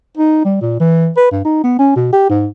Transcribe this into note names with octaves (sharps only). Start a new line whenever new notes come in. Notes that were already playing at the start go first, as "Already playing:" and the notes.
D#4
G3
A#2
E3
B4
G2
D#4
B3
C#4
B2
G4
G#2